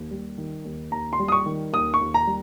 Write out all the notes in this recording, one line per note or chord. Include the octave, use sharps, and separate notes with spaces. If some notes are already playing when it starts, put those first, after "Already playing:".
Already playing: D#2
G3
D#3
D#2
D#2 A#5
C6
G3
D#6
C#6
D#3
D#2 D#6
C#6
D#2
A#5
G3